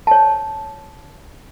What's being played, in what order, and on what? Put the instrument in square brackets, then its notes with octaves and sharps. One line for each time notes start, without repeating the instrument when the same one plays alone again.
[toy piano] C#5 A5